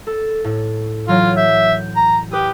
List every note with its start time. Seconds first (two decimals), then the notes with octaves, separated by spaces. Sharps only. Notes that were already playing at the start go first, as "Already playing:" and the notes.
0.07 A4
0.44 A2
1.08 E3 F#3 F4 C#5
1.37 E5 G6
1.96 A#5
2.31 G4 B4 D#6